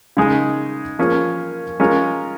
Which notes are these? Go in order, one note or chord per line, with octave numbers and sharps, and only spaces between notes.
C#3 G#3 D#4 G#4
F3 A#3 C#4 G#4
G#3 C#4 F4 A#4